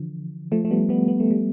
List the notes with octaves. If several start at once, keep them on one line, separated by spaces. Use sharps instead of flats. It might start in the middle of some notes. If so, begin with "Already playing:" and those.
Already playing: D3 E3 F3
F3 A3
A3
G3 B3
G3 B3
B3
A3
G3